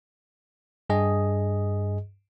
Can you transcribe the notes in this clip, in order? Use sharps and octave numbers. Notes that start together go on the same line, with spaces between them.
G2 G#4 D#5